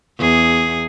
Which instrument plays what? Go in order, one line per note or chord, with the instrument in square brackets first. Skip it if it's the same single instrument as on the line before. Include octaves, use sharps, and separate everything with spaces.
[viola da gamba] E2 G#4